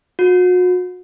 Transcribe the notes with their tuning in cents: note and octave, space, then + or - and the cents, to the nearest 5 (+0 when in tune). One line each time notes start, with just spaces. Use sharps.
F#4 -35